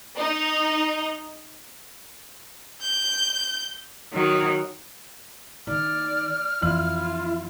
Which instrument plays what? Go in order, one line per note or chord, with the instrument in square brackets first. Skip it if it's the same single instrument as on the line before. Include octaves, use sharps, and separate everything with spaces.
[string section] D#4
[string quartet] G6
D#3 F#3
[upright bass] D#3 [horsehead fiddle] D5 [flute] F6
[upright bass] F2 [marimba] E3 [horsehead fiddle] E4 F4